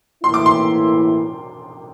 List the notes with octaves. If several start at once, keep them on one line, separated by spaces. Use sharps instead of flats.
A2 E3 A#3 E4 C6
D6
C6